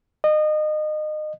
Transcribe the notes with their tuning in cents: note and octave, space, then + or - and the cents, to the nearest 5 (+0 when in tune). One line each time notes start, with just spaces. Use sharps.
D#5 -30